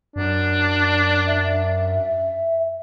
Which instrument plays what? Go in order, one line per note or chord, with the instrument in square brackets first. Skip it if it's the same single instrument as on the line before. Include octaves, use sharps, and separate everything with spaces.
[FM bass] F#2 [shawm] D4
[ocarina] E5